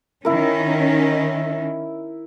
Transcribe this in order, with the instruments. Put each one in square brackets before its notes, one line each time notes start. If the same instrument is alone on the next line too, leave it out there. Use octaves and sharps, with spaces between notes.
[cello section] D#3 C#4 [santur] E4 A#4